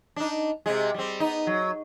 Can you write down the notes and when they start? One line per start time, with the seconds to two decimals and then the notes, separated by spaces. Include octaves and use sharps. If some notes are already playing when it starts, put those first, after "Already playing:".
0.16 D4 D#4
0.66 C3 G#3
0.94 G3 C4
1.20 B3 D#4
1.47 F#3